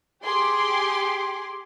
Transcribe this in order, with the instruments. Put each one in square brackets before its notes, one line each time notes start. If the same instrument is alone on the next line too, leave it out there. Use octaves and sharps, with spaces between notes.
[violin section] G4 G#4 C6 D6